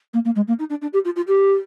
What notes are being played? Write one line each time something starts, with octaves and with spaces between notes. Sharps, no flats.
A#3
A#3
G#3
A#3
D#4
D4
D4
G4
F4
F4
G4